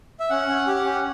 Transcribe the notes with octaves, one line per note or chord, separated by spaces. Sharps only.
E5
C#4 F#5
C#4
G4
C#4